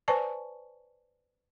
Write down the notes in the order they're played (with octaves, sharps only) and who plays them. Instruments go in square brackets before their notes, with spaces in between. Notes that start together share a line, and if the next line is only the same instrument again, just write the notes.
[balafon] B4 C5 D5 G#5 A5 C#6